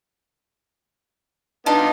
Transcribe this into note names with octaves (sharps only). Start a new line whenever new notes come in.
B3 D4 D#4 F4